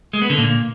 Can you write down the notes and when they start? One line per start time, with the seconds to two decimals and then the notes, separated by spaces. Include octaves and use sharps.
0.13 G#3
0.22 B3
0.30 D3
0.38 A#2